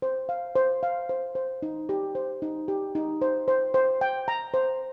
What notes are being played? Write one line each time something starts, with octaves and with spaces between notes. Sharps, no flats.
C5
F5
C5
F5
C5
C5
D#4
G4
C5
D#4
G4
D#4
C5
C5
C5
G5
A#5
C5